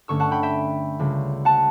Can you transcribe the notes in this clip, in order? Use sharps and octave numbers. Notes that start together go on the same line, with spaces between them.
G2 D3 A3 C#4 C#6 E6
F#5 A5
G5 B5
E5 G5
C#2 C#3 G3
F#5 A5